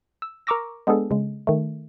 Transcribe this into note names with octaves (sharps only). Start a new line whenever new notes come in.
E6
A#4 A#5 C#6 D6 E6 A#6
G#3 B3 D4 G#4 A4
C#3 G#3
D#3 A3